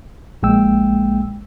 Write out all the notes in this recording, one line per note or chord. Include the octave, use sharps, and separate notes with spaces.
A#1 G#3 A#3 G5 E6